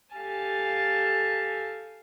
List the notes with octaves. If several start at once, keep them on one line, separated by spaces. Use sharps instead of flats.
G4 A4 F5 G#5 A5